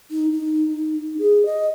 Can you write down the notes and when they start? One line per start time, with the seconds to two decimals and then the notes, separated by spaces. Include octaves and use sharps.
0.11 D#4
0.33 D#4
1.19 G#4
1.46 D#5